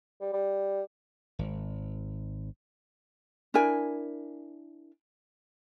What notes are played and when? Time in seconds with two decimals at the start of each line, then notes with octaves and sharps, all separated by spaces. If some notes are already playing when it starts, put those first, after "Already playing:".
0.21 G3
0.33 G3
1.39 G#1
3.54 D4 E4 A#4 G#5